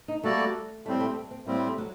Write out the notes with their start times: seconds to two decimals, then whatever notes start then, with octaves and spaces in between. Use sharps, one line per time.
0.08 D#4
0.24 G3 A3 A#3 F#4 A4 D5
0.86 A2 G3 A3 C4
1.01 A3
1.16 C4
1.31 C4
1.46 A2 G3 A#3 C4
1.67 A3
1.78 F#3